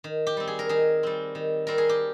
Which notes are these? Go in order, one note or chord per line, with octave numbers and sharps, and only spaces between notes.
D#3
G4
G3 C4
G#4
A#4
D#3 G#4
G3 C4
D#3
G3 C4 A#4
G#4
G4